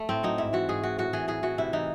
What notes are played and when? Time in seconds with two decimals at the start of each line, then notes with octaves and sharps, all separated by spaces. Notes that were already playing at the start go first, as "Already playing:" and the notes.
Already playing: A3
0.09 A2 C4
0.23 F#3 D#4
0.38 G#2 E4
0.53 E3 F#4
0.69 G#2 G#4
0.83 E3 F#4
0.98 A2 F#4
1.13 E3 G#4
1.28 A2 G#4
1.43 E3 F#4
1.58 C3 E4
1.73 E3 D#4